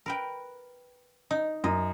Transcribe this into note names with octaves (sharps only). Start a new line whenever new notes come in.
A#4 B4 G5
D#4
F#2 D#5